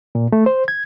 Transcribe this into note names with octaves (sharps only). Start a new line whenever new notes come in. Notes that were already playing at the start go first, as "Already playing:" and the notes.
A#2
A3
C5
G#6